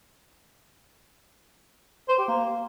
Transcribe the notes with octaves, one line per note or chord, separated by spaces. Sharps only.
C5
G4
A#3